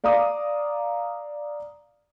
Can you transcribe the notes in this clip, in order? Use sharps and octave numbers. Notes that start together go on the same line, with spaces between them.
D5 F5 A#5 D6 D#6